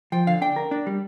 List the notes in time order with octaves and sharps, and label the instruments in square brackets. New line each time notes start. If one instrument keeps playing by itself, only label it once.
[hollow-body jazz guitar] F3 [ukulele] G5
[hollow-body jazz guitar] D3 [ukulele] F5
[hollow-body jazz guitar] D4 [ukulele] G5
[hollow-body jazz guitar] A#4
D4
G3